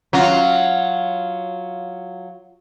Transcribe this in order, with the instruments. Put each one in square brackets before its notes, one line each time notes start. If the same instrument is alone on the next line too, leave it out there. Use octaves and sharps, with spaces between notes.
[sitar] F#3 F4 F#4